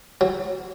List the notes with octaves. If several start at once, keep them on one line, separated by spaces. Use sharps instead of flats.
F#3